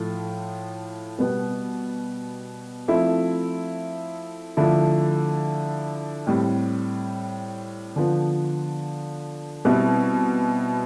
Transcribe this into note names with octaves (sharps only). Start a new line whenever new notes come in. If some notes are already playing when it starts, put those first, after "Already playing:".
Already playing: A2 F3 A3 F4
B2 G3 B3
F3 A3 C4 E4
D3 F3 A3 E4
A2 G3 C4
D3 F3 B3
B2 G3 C4 E4